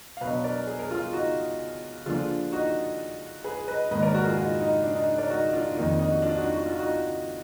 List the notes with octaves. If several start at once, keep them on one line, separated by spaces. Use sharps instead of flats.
F5
B2 F#3 B3 D4 B4 D#5
A#4 D5
G#4
A#4
F4 G#4
D#4 F#4
D3 F3 A#3 D4 F4 G#4
D#4 F#4
G#4 B4
B4 D#5
G#2 D#3 A#3 B4 D#5
A#4 D5
F#4 A#4
F4 G#4
D#4 F#4
D#4
D4
D#4
A#4 D5
D#4 F#4
D4 F4
F2 D#3 A#3 D4 D#4
D#4
F#4
D4 F4
D#4 F#4
F#4
F4
D#4 F#4